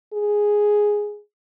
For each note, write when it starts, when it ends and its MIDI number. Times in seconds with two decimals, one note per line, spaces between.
0.13 1.20 68